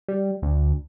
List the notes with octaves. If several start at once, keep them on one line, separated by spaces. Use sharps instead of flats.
G3
D2